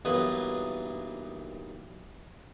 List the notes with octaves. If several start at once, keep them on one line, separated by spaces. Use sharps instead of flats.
B1 G2 E3 A#3 B4 D#6